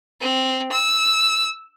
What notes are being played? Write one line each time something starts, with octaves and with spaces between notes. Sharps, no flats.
C4
E6